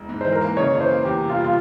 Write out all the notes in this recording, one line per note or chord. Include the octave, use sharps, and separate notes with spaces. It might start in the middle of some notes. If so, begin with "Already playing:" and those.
Already playing: E1
G#2
E3 C5
A#4
A#3
C#3 C#5
E3 C#5
C5
A#3
E2 G4
C3
F4
G3
F4